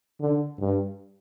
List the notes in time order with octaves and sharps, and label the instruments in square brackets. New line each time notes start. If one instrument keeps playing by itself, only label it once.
[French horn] D3
G2